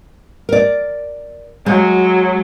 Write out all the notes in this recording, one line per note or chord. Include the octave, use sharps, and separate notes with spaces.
A#4 D5
F#3 G#3